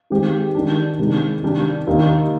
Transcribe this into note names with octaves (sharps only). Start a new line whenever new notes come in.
D#3 G#3 C4 G4
D#3 G3 D4
C3 D#3 G#3
C3 D#3 G3 D4
D#2 D#3 A#3 D#4